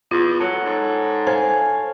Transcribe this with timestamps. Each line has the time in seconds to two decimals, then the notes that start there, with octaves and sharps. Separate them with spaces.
0.11 E2 F4
0.40 F#3 A4 C#5 F#5
0.65 G#2
1.27 C5 C#5 F5 G#5